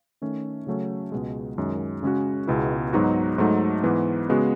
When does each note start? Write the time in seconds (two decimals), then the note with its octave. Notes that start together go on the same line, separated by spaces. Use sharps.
0.22 D#3 A3 C#4
0.67 C#3 F#3 A3 C#4
1.12 C#2 B2 G#3
1.58 F#2 D#3 G#3
2.03 C#3 G#3 C#4 F#4
2.48 C#2 B2 G#3 B3 E4
2.93 G#2 F#3 B3 D#4 F#4
3.38 G#2 F#3 A3 D#4
3.84 G#2 E3 B3
4.29 C#3 G#3 B3 F#4